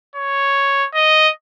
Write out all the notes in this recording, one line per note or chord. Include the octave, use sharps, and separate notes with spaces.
C#5
D#5